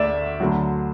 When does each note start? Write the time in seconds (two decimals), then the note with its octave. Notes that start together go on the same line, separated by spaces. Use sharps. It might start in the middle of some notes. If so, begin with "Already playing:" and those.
Already playing: D2 D3 A3 D5 E5
0.40 D2 D3 F#3